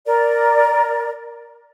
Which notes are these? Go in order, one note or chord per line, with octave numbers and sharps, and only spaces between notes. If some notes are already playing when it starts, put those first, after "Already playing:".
A#4 D5